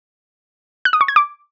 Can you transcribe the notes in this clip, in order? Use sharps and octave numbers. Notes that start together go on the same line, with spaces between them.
F#6
D#6
C#6
G#6
D6